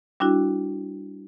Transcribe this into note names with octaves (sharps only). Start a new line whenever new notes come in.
G3 D4 E4 F#4